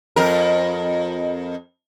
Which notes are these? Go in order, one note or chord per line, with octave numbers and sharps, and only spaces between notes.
F2 A#4